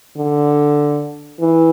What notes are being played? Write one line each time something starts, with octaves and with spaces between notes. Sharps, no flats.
D3
E3